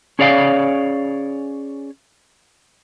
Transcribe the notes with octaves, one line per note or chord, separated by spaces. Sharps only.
C#4 G#4 C#5 D5 F5